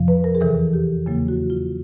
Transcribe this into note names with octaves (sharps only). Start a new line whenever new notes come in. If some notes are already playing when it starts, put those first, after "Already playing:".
Already playing: F2 C3 F3
B4
A#4
G#4
E2 C3 E3 A4
G4
E2 C#3 F#3 A#3
F#4
F4